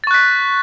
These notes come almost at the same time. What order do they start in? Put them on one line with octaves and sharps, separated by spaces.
A6 C#6 F#6 B6